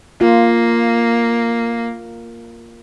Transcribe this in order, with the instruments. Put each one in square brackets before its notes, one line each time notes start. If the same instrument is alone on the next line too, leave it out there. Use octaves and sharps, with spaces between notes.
[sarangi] A#3 [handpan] F4